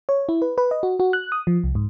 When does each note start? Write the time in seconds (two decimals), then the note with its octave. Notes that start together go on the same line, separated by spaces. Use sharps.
0.09 C#5
0.29 E4
0.42 B4
0.58 B4
0.71 D#5
0.83 F#4
1.00 F#4
1.13 F#6
1.32 D#6
1.47 F3
1.64 C2
1.75 G#2